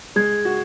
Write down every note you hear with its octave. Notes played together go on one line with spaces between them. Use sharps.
G#3 G#6
F#4